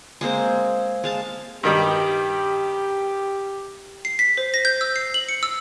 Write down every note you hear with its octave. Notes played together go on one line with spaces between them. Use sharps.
G#3 A#3 C4 C5
G#3 F5 A5
G2 D#3 G3 G4
C7
B6
C5
A#6
G6
E6
C7
F#7
C#7
E6